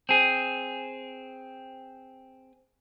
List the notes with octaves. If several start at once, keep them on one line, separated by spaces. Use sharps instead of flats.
C4 G#4